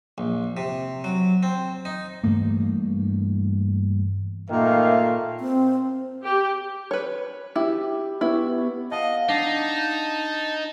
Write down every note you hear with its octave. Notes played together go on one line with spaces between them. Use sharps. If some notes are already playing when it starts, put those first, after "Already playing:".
A#1
C3
F#3
C4
D#4
G2 E3 A3 A#3
A#2 D#3 A3 A#3 A#4 E5 F5
C4
G4
B4 C#5
E4 G4
B3 E4 C#5
D#5 F5 F#5 A5
D4 D#4 A5 A#6 C7